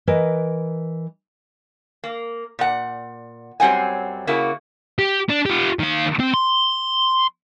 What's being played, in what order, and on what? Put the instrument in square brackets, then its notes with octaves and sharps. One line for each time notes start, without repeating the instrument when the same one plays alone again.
[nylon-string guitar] E3 A#4 B4 D#5
[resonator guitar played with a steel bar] A#3
A#2 F#5
F#2 F#3 G3 C4 F#5 G#5
C#3 A#3 E4 F#4
[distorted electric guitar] G4
D4
F4 G4
D#3 F5
C4
C6